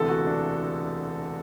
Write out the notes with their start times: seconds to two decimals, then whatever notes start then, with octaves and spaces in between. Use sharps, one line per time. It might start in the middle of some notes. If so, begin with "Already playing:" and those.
Already playing: E1 D2 C3 E3 A4
0.09 F#4
0.27 D4